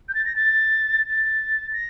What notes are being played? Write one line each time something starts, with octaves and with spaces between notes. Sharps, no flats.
G6
A6
A#6
A6
A6
A#6